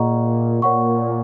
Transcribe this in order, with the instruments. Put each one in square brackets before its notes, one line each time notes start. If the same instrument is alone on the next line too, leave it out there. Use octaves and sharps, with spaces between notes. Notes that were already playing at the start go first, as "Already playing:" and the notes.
Already playing: [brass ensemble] A#2 [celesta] G#4 D#5 F#5 A#5 C#6
[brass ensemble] A#2 [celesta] C#5 F#5 C#6